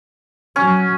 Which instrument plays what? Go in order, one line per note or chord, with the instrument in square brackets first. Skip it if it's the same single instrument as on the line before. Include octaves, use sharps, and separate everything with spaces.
[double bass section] F#3 [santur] C#4